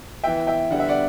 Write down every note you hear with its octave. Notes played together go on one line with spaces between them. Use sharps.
E3 B3 E5 G5
E5 G5
D3 G3 B3 F#5
E5
D5 F#5